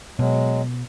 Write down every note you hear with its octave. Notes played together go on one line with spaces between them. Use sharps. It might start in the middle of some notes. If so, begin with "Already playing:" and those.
B2 F#3 G#3